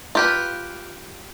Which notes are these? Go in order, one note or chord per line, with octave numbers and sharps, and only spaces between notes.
F4 G4 B4